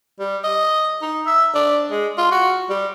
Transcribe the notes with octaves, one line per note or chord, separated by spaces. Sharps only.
G3
D#5
D#4
E5
D4
G#3
F4
F#4
G3